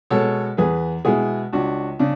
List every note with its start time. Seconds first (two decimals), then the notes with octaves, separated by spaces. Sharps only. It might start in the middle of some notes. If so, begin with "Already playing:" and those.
0.10 B2 G#3 A4 C#5
0.57 E2 G#4 B4
1.05 B2 G#3 E4 G#4
1.52 C#2 D4 F#4
1.99 C#3 D4